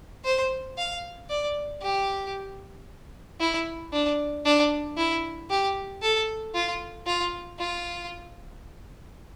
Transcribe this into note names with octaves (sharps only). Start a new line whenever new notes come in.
C5
F5
D5
G4
E4
D4
D4
E4
G4
A4
F4
F4
F4